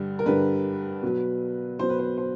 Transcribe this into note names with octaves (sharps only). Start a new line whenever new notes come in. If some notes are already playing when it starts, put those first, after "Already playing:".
Already playing: G2 D3 G3
A#4
G2 D3 G3 B4
B2 F#3
B2 F#3 C5
B4
C5
C5